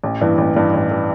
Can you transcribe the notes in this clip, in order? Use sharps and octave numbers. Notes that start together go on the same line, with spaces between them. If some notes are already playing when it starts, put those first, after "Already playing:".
A1
G2 E3
A1
G2 E3
A1
E3